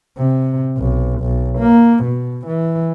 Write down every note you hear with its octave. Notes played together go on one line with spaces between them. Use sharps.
C3
B1
B1
A#3
B2
E3